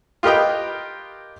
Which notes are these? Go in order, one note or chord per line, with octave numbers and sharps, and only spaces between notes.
F4 G4 A#4 B4 D#5 G5